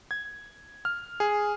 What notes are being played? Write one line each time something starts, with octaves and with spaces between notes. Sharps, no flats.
G#6
F6
G#4